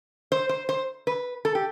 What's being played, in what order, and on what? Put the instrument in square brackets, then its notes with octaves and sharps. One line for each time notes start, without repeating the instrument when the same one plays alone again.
[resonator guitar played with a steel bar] C5
C5
C5
B4
A4
G4